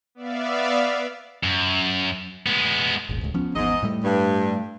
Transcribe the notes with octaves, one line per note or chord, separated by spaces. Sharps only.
B3 D5 E5 F5
F#2
G#3 B3
D#1 G#1
D1 C#2
F3 B3 C#4
G#1 E2 G#2 B3 D#5
A2 G3 A3
G2